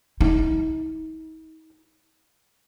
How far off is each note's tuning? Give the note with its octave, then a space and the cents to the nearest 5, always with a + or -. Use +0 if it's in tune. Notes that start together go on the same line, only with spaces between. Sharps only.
D#4 +40